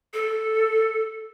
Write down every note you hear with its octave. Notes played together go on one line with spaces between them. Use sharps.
A4